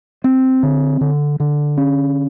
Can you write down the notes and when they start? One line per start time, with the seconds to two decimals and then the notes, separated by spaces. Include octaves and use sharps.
0.24 C4
0.63 D3
1.01 D3
1.40 D3
1.77 C#4